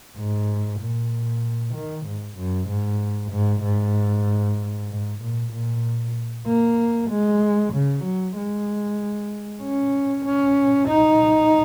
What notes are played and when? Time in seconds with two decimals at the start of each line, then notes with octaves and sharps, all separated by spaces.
0.17 G#2
0.80 A#2
1.74 D#3
2.06 G#2
2.37 F#2
2.68 G#2
3.31 G#2
3.63 G#2
4.89 G#2
5.21 A#2
5.52 A#2
6.47 A#3
7.10 G#3
7.73 C#3
8.04 F#3
8.36 G#3
9.63 C#4
10.25 C#4
10.88 D#4